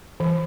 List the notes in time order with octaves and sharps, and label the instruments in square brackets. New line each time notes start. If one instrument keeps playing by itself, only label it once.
[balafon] E3